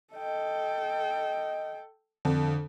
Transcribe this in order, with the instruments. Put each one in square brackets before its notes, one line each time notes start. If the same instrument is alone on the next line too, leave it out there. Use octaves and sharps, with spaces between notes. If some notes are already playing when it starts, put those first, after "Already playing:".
[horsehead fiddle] A4 G5 [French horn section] D#5
[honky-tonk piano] F2 [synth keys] D3